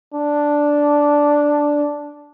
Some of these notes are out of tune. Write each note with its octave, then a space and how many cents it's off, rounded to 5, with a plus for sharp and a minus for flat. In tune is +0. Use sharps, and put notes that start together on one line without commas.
D4 -5